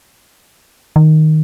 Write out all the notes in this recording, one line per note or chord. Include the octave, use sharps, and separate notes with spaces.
D#3